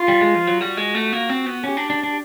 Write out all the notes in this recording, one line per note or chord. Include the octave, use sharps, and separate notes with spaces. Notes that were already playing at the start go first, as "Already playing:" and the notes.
Already playing: F4
G3
G#3
F3
F#3
G3 F#4
G#3
A3
A#3
C4
B3
C#4 G4
D4
D4
D4